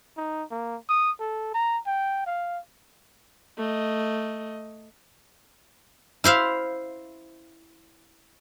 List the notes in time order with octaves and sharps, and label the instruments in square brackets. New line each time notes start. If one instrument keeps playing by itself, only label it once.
[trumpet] D#4
A#3
D#6
A4
A#5
G5
F5
[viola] A3 D#5
[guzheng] E4 C5 E5 F5